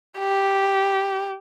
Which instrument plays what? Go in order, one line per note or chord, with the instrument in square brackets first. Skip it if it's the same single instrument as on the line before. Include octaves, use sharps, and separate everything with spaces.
[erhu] G4